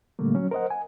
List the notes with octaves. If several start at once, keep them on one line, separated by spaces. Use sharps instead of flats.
A#2 D3 G3 A3 A#3
F#3 C#4
A#4 C5 D#5 F#5
G#5